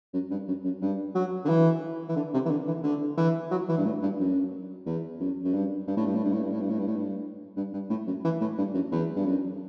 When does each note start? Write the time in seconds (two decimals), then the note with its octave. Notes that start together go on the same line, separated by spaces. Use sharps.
0.14 F#2
0.31 G2
0.48 F#2
0.65 F#2
0.82 G2
1.15 F#3
1.45 D3
1.49 E3
2.09 E3
2.16 D3
2.34 C3
2.45 E3
2.51 D3
2.67 E3
2.84 D3
3.18 E3
3.51 F#3
3.69 E3
3.78 G2
3.85 A2
4.02 G2
4.20 F#2
4.86 E2
5.20 F#2
5.44 F#2
5.54 G2
5.88 G2
5.97 A2
6.06 G2
6.15 A2
6.24 G2
6.33 A2
6.42 G2
6.52 A2
6.61 G2
6.69 A2
6.79 G2
6.87 A2
6.96 G2
7.56 G2
7.73 G2
7.90 A2
8.07 F#2
8.25 E3
8.41 A2
8.58 G2
8.74 F#2
8.92 E2
9.16 G2
9.26 F#2